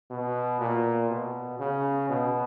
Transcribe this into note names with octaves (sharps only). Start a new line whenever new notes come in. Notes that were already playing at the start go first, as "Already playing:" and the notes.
B2
A#2
B2
C#3
B2